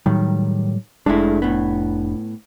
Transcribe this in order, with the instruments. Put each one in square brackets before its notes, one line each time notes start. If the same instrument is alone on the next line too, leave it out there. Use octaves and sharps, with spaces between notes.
[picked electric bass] A2 F#3 G3 [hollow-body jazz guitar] D#3
[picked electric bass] F1 D4 [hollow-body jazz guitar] G#3 A3 E4
[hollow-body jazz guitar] A2 B3